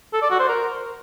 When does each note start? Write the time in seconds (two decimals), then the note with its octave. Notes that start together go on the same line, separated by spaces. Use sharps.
0.13 A4
0.22 D5
0.31 F#4
0.39 C5
0.48 A#4